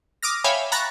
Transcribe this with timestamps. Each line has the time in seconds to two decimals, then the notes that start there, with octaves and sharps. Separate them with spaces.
0.23 D6 D#6 F6 A#6
0.44 C#5 E5 F5 G5 G#5 B5
0.72 A#5 B5 C#6 F#6 A6 A#6